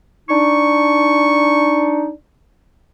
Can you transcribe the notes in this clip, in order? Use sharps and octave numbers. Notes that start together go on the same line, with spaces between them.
D4 D#4 C#6